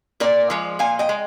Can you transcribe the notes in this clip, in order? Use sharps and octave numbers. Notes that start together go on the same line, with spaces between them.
A#2 A#4 D5
F3 G#3
A#2 F5 G#5
D#5 G5
G#3